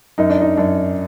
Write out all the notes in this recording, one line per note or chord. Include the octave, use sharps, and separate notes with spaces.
F#2 D#4
D4
D#4
F#2 D4